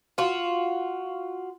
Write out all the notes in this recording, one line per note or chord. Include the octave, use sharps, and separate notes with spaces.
F4 F#4